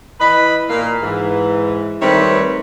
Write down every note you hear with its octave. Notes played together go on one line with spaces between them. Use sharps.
E3 B4 D#5 B5
A#2 A#3 F5
G#2 E3
D#3 G3 A3 C4 B4 C#5